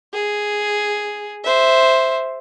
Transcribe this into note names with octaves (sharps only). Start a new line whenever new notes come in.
G#4
C5 E5